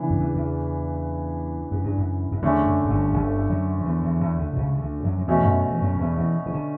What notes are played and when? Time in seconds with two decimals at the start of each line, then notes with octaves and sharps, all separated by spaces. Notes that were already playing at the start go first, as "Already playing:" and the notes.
Already playing: C#3 E3 B3 D4
0.10 F#2
0.20 E2
0.35 E2
1.71 F#2
1.84 G2
1.98 F#2
2.32 F#2
2.42 E2 D3 A3 C#4
2.66 F#2
2.85 F#2
2.90 G1 G2
3.13 G1 G2
3.49 F#2 F#3
3.79 F#3
3.85 E2 E3
4.03 E2 E3
4.20 E2 E3
4.38 D2 D3
4.53 B2
4.56 C#2 C#3
4.75 C#3
4.80 D2 D3
5.04 F#2 F#3
5.19 F#3
5.28 E2 B2 E3 A3 C#4 F#4
5.38 E3
5.45 F#2 F#3
5.71 E3
5.81 F#2 F#3
5.95 F#3
6.00 E2 E3
6.17 E2 E3
6.46 E3
6.53 D3